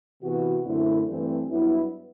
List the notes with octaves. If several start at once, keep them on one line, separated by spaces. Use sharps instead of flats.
C3 E3 B3 F#4
F#2 D3 A3 C4 E4
G2 E3 A3 C4
G2 F#3 B3 E4